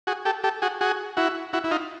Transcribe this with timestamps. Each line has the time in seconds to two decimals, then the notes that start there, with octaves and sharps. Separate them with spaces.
0.07 F#4 G#4
0.25 G4 A4
0.44 G4 A4
0.62 F#4 G#4
0.81 F#4 G#4
1.17 E4 F#4
1.53 E4 F#4
1.64 E4
1.71 D#4 F4